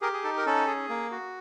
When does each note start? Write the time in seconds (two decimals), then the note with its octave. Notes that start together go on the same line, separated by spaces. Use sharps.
0.01 G4 G#4 A#4
0.13 G#4
0.24 D#4 A4
0.37 A#4
0.46 C#4 A4
0.67 G#4
0.89 A#3
1.11 F#4